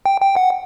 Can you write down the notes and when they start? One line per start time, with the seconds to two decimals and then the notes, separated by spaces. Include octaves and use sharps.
0.06 G5
0.21 G5
0.36 F#5